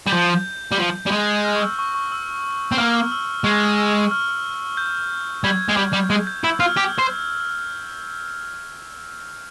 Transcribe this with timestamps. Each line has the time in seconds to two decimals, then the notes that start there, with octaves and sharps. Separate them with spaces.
0.07 G3
0.12 F3 G6
0.72 G3
0.78 F3
1.06 G3
1.12 G#3
1.45 F6
1.55 C#6
1.62 E6
1.79 C#6
1.95 C#6
2.12 E6
2.72 C4
2.78 A#3 F6
3.12 E6
3.44 G#3 C#6
3.78 E6
4.11 F6
4.77 G6
5.44 G3 G#6
5.69 G#3
5.77 G3
5.93 G3
6.10 G#3 G#6
6.27 G6
6.44 E4 E6
6.60 F4 F6
6.77 G4 G6
6.98 C5